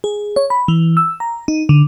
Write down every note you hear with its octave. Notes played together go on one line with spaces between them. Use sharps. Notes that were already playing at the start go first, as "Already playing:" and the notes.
G#4
C#5
B5
E3
E6
A#5
D#4
D3